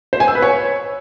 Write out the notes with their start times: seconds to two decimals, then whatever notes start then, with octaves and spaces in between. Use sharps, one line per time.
0.13 C5
0.20 G#5
0.28 E6
0.35 B4
0.42 C#5